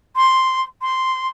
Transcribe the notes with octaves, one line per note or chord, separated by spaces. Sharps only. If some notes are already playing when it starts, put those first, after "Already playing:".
C6
C6